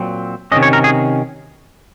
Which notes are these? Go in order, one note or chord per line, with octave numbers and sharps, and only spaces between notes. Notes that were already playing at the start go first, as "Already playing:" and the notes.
Already playing: A#2 F#3 C4
C3 D#3 G#3 C#4 D#5
C#5
A#4
G#4